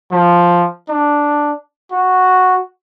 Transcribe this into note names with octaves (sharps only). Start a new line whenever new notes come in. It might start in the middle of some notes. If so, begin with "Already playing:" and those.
F3
D4
F#4